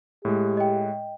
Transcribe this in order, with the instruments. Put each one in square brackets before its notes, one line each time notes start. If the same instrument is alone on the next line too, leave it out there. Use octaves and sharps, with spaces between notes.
[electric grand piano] A2 G#3 [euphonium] G4
[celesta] D#5 G5